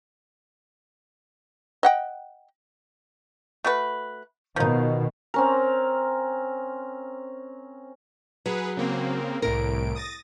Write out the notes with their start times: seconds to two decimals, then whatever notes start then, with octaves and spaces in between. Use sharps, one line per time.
1.83 D#5 F#5 G5
3.64 A3 F#4 B4
4.56 B2 D#3 F3 D#4
5.34 C4 C#4 A#4
8.46 F#3 G#4 B4
8.77 C#3 A#3 C4
9.42 C2 A2 A#4 D7
9.95 D#6 A6 A#6